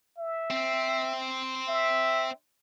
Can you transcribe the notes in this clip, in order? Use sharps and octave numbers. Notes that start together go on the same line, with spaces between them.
E5
C4
E5